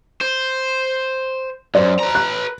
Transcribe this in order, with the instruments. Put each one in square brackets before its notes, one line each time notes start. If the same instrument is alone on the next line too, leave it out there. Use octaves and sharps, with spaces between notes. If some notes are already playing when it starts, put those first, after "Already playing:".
[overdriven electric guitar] C5
[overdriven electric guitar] F#2 [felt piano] C5 D5
[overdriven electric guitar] B4 A#5
[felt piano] F#6